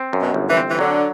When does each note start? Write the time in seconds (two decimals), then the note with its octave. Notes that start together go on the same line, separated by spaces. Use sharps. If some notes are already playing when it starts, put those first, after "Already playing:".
Already playing: C4
0.13 F#2
0.21 B2
0.34 G1
0.50 E3
0.57 C4
0.69 E3
0.79 D3 F#3